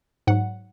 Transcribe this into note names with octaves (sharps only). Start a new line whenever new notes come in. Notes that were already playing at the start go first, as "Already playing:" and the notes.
G#2 F#3 F#5